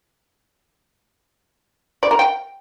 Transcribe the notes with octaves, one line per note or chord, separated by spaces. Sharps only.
D5
A#4
G5